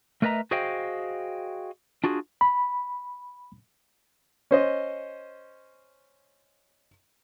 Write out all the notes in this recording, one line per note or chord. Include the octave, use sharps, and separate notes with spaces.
A3 A#4 B4 D#5 E5 A#5
F#4 G#4 C5 D#5 F5 G5
D4 F4 F#4 G#4
B5
C#4 C5 D#5